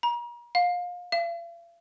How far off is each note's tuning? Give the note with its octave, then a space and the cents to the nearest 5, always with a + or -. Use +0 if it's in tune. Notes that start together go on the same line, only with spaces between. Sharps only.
A#5 +40
F5 +30
F5 -45